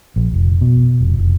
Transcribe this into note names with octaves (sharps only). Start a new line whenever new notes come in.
A#1
F1
B2
F1
F1